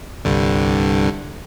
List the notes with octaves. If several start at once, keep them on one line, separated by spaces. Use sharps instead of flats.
C2 G2 D3